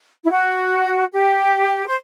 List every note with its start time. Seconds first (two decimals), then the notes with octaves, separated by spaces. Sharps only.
0.24 E4
0.31 F#4
1.13 G4
1.87 C5